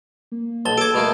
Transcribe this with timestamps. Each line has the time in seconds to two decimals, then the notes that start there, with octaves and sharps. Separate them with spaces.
0.32 A#3
0.66 B1 A5 A6 G7
0.78 G#4 A4 D6 G#6 D7
0.94 B2 A3 A#3